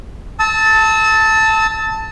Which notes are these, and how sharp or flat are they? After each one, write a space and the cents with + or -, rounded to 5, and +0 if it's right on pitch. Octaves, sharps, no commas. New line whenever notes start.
A5 +5 E6 -35